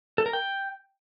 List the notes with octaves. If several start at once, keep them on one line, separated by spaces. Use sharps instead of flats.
A4
A#4
G5